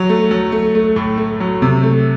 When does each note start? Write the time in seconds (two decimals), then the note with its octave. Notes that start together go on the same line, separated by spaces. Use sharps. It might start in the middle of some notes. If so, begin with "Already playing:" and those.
Already playing: F#3
0.09 A3
0.31 F#3
0.52 A3
0.75 A3
0.96 A2
1.18 A3
1.40 F#3
1.62 C3
1.83 A3